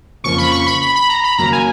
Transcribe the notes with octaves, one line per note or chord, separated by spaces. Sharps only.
F2 C#3 F3 A#3 C#4 C#6
B5
C#6
B5
B5
B5
A#5
B5
D#2 C#3 F#3 A#3 A#5
G#5